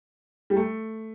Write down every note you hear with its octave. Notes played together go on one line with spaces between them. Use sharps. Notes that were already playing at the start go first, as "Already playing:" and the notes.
G3
A3